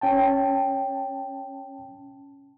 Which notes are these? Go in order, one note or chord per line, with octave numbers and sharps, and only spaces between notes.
C#4 G5 A5